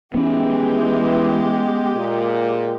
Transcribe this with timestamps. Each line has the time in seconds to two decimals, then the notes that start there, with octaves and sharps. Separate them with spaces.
0.14 E3 G#3 B3 C#4 G4
1.96 A#2